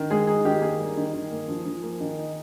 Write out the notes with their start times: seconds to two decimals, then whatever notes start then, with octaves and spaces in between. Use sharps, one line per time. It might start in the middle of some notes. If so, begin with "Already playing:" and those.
Already playing: D#3
0.10 G#3 G#4
0.27 D#4 G#4
0.45 D#3 G4
0.61 A#3 G#4
0.79 G3
0.97 D#3
1.14 D#3
1.32 A#3
1.48 F3
1.65 F3
1.83 A#3
2.00 D#3
2.18 D#4